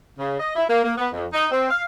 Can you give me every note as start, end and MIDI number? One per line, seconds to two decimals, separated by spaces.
0.19 0.38 49
0.40 0.54 75
0.55 0.65 64
0.70 0.83 58
0.84 0.93 58
0.98 1.07 59
1.13 1.26 41
1.33 1.45 63
1.51 1.70 60
1.71 1.85 77